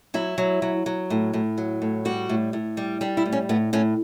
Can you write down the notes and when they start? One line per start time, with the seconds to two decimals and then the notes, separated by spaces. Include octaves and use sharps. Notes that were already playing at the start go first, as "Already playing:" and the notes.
0.14 F#3 E4
0.38 F#3
0.62 F#3
0.86 F#3
1.10 A2
1.33 A2
1.58 F#3
1.82 A2
2.05 G3 F#4
2.29 A2
2.53 A2
2.77 G3
3.01 G3 D4
3.17 E4
3.26 A2
3.32 C#4
3.49 A2 B3
3.73 A2 C#4